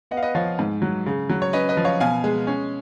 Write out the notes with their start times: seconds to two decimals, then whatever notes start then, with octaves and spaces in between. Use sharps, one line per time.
0.11 B3 D#5 F#5
0.17 F5
0.23 B4 D#5
0.35 F3 C#5 F5
0.59 G#2
0.82 F#3
1.06 C#3
1.30 F#3
1.42 C#5
1.53 C#4 B4 D#5
1.69 B4 D#5
1.77 F3
1.85 C#5 F5
2.00 B2 F5 G#5
2.24 G#3
2.47 C#4